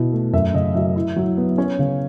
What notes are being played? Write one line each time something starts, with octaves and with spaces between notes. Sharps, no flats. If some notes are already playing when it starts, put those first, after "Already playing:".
Already playing: B2 E4
A3
F#2 E5
C#3 D#5
F#3 E5
E4
F#3
B3
C#4 C#5
C#3